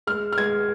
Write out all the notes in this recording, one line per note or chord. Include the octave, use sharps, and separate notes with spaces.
G#3 F6
F6
G#3 G#6